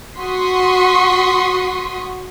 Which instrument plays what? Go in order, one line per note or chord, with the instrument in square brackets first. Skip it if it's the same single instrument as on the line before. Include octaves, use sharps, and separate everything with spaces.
[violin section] F#4 C6 C#6 D#6 B6